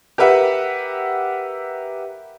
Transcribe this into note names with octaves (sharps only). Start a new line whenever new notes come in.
G4 A#4 B4 E5 F#5